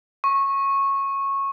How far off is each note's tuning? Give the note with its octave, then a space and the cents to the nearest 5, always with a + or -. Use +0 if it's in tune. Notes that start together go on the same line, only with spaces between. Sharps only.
C#6 -15